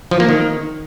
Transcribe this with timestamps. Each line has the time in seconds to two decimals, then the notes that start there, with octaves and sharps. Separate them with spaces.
0.11 F3
0.20 A#3
0.29 D#3